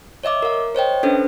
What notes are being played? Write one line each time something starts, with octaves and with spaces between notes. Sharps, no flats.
C#5 D#5 E5 D6
A#4 F5
C5 C#5 D#5 G5
C#4 D4 A4 B4 C5